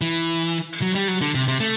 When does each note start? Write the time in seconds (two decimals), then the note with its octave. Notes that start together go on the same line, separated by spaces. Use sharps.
0.01 E3
0.82 F#3
0.95 G3
1.08 F#3
1.21 D3
1.35 C3
1.48 C3
1.60 A3